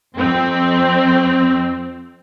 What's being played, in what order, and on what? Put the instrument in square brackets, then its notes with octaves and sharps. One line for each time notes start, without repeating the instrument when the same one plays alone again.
[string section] F2 C4